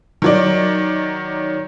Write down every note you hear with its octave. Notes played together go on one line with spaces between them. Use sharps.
D#3 F#3 D5